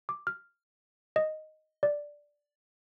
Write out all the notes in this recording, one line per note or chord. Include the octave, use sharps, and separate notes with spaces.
D6
F6
D#5
D5